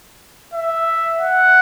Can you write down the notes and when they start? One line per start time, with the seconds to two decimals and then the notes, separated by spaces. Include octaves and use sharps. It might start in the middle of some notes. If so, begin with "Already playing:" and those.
0.54 E5
1.19 F#5